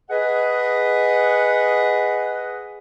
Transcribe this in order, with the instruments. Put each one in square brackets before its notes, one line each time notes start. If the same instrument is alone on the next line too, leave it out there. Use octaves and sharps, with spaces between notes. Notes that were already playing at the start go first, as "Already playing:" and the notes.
[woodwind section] G#4 B4 D#5 F#5